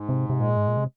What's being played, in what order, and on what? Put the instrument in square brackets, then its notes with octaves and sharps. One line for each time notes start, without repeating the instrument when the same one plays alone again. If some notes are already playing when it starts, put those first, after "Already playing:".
Already playing: [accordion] G#2
[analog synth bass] C3
C3
[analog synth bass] A#2 [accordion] G#3
[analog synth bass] G#2
A#2
C3